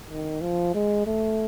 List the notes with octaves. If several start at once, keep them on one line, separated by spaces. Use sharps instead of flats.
D#3
F3
G#3
A3